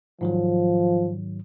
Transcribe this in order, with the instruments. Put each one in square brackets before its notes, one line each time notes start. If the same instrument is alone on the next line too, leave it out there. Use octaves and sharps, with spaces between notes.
[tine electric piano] G#2 D#3 F#3 [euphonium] F3